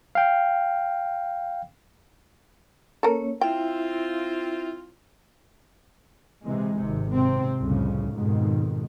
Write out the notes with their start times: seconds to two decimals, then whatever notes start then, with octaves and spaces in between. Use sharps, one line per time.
0.15 F5 G5
3.03 A#3 C#4 A4 A#4 C#5
3.41 C4 E4 F4 E5 G5
6.43 C3 E3 G#3
6.76 G#1 C3
7.14 C3 C4
7.59 C2 F2 A2 C#3
8.10 F2 G#2 B2 D#3